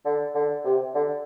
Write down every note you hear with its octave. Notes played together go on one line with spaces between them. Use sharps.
D3
D3
C3
D3